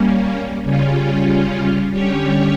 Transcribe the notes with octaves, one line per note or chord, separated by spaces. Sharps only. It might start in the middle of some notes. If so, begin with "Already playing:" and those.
Already playing: G3 A#3 C#4
C#3 G3 C#4 F4
D3 G3 C#4 G4 C#5